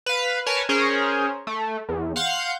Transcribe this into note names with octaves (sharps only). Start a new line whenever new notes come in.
B4 F5
A#4 B4 C#5 G#5 A5
C#4 G#4 A#4 C5 C#5
A3
E2
F5 F#5 C6 G6